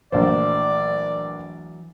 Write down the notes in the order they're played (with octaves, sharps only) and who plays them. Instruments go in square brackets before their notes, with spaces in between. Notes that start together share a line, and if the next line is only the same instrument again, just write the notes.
[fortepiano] A#1 C5 [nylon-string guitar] E3 F#3 A3 [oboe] D5